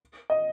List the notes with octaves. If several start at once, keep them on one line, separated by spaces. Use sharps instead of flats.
D#5